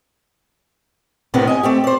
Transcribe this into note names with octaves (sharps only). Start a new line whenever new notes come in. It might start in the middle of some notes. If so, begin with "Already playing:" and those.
A2 C3 D#3 B3 C4 D4
D#5 G#5
A3 C4 G4
C5 D5